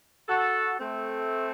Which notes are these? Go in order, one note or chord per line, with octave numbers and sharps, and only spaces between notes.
F#4 A4
A3 C4